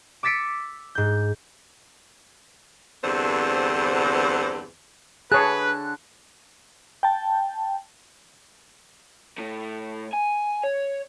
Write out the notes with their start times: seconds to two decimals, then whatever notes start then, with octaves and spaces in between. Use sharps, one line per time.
0.23 D6 E6 A6 B6 C#7 D7
0.95 G#2 G6
3.04 E2 G2 D3 C4 C5
5.32 D3 G#4 B4 C#5 A5 F#6
7.03 G5 A5
9.38 A2 A3
10.13 G#5
10.63 C#5